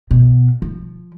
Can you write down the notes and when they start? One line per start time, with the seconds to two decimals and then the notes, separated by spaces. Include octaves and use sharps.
0.11 B2
0.62 F3